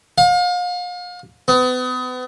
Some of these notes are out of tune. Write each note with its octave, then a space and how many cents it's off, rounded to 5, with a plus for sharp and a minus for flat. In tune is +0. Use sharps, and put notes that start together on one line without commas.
F5 +35
B3 +35